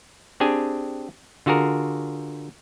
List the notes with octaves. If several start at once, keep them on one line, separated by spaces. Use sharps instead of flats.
C4 D4 G4 G#4 G#5
D3 F4 F#4 G#4 A#4